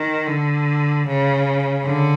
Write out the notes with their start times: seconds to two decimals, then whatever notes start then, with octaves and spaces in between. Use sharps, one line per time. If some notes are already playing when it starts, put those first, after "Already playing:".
Already playing: D#3
0.28 D3
1.07 C#3
1.85 D3